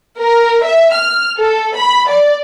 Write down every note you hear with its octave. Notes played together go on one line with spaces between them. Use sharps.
A#4
E5
F6
A4
B5
D5